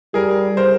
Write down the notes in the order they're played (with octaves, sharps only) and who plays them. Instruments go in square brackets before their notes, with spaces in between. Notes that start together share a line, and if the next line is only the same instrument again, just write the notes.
[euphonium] G3 [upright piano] G#4 A#4
[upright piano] A#4 C5